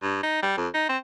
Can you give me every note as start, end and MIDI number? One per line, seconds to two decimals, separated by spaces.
0.03 0.19 43
0.23 0.42 63
0.43 0.55 55
0.57 0.68 41
0.74 0.87 63
0.89 0.98 60